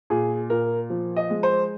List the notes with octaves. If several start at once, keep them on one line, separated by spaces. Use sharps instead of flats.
A#2 G#4
A#2 A#4
F3
D#5
G#3
C5